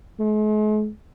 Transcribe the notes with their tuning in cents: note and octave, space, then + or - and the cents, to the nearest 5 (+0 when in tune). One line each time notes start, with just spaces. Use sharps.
G#3 +45